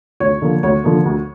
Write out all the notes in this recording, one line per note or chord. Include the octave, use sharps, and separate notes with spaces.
D2 C#5
D3 F3 A#3
D2 C#5
D3 F3 A#3
D2